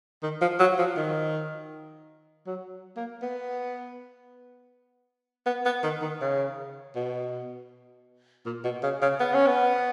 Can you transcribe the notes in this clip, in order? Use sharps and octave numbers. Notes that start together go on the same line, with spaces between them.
D#3
F3
F#3
F3
D#3
F#3
A#3
B3
B3
B3
D#3
D#3
C#3
B2
A#2
B2
C#3
C#3
B3
C#4
B3